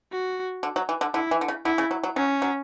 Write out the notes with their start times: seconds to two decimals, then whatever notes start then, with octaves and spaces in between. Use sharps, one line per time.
0.12 F#4
0.63 D3
0.76 F#3
0.89 E3
1.01 D3
1.14 D3 E4
1.31 E3
1.41 D3
1.48 C#3
1.65 D3 E4
1.78 C#3
1.91 F#3
2.03 F#3
2.16 F#3 C#4
2.42 F#3